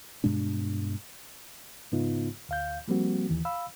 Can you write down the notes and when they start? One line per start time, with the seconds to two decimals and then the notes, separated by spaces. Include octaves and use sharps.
0.24 G2 B2 G#3 D4
1.92 G#2 C#3 B3 D#4 F4
2.49 D2 F5 G6
2.88 F3 G3 A#3 C4 F#4
3.30 D#2 E3
3.45 F5 B5 E6